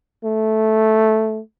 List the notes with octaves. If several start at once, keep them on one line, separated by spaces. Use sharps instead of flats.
A3